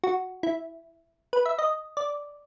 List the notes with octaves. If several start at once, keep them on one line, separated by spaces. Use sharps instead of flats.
F#4
E4
B4
E5
D#5
D5